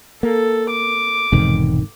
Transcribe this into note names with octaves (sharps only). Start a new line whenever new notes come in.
A#3 A4
D6
E1 G#2 C3 D#3